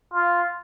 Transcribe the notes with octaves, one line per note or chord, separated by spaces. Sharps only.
F4